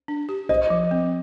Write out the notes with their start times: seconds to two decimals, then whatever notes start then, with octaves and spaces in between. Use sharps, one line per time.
0.08 D4
0.29 G4
0.49 C5 D#5
0.70 F3
0.91 C4